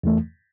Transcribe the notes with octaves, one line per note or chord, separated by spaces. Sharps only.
E2 E3 A3